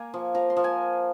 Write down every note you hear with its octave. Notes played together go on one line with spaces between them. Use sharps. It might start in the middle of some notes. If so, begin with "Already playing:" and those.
Already playing: A#3 G#5
F3
F3 A#5
C6
F3
G#5